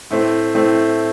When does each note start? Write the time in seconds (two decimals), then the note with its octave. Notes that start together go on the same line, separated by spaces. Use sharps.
0.11 A2 A3 C4
0.55 A2 A3 C4